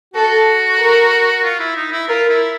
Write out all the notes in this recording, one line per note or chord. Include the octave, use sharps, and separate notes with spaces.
F#4 A4
A#4
F4
E4
D#4
E4
F4 A#4
E4